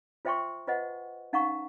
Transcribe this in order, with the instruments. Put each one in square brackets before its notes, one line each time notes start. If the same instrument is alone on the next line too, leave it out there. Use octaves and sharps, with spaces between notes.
[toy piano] F4 C5 E5 G5 C6 C#6
F4 B4 C5 D#5 F#5
C#4 D#4 F5 F#5 A#5 C#6